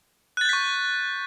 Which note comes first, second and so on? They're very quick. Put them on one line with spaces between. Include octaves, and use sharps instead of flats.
F#6 A6 G6 B6 C#6